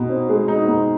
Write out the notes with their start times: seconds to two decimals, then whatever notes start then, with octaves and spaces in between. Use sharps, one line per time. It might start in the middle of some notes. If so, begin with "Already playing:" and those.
Already playing: B2 D#4
0.09 C4
0.29 G#3
0.48 D#4
0.68 B2